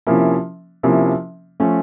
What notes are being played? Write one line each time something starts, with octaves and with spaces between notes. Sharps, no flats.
C3 F3 A#3 C#4 E4
C3 F3 A#3 C#4 E4
F3 A3 C#4